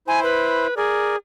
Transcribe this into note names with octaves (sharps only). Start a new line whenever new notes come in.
E4 C5 G#5
B4
G#4 A#4 D5